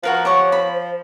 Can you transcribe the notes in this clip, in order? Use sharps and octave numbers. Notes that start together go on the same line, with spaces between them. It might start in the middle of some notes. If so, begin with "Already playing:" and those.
F3 F#4 A#4 B4
G4 C#5 F#5 C#6
B5
C5